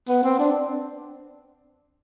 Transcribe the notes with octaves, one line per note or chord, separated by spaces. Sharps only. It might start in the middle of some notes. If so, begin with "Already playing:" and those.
B3
C4
D4